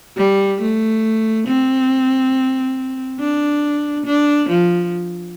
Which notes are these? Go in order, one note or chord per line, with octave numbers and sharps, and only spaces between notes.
G3
A3
C4
D4
D4
F3